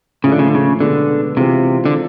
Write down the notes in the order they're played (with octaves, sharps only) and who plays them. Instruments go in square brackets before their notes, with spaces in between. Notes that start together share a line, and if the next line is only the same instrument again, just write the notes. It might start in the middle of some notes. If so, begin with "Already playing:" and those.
[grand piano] A2 F3 G#3 C#4 E4 [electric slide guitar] C#3
[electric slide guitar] D3
C#3
D3
C#3
[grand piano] B2 G#3 B3 [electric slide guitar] D3
[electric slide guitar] C3 [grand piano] E3 G#3 C4 F4
[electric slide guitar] D3